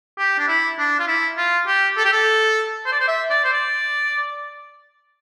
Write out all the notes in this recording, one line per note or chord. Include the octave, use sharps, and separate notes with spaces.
G4
D4
E4
D4
F4
E4
F4
G4
A4
G4
A4
C5
D5
C5
E5
D5
C5
D5